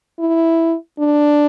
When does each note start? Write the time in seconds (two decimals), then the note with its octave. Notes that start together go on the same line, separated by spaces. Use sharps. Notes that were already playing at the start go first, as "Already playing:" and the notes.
0.19 E4
0.99 D4